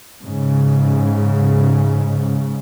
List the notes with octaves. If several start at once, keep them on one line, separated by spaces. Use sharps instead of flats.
G#2 C#3